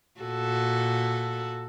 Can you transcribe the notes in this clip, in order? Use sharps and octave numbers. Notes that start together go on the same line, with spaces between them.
A#2 F#4 A4